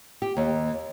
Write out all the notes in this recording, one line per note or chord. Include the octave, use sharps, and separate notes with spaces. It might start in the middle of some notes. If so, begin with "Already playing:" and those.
G4
D#2